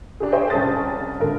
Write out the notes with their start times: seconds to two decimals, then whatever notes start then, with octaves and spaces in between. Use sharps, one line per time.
0.20 D4 G4 G#4
0.32 G#4 C5 C#5 D#5 E5 G5
0.50 C2 C#4 G#4 A5 D#6 A6
1.20 G#1 D3 A4 A#4